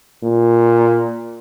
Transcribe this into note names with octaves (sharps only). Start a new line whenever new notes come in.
A#2